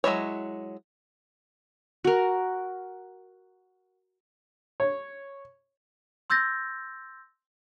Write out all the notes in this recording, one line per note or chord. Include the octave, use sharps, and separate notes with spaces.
F#3 G#3 E4 C#5
F#4 A#4
C#5
C6 E6 G6 A6 A#6